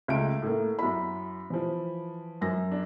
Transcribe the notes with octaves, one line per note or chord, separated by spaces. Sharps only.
C#2 A3 E5 D7
A2 A#3
F#2 E4 B5
E3 F3
F#2 A#6
D4